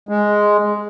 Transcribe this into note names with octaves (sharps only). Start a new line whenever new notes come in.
G#3